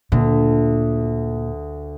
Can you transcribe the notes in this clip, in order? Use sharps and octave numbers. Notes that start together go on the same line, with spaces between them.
D2 A#2